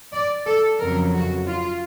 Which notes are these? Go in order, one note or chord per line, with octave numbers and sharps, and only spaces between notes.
D5
A4
F2 C#3 F#3 A#4
F#4
F4